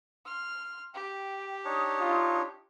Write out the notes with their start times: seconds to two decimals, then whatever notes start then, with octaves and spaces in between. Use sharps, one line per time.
0.26 C6 F6
0.94 G4 G5
1.65 D4 D#4 C#5 D#6
2.00 F4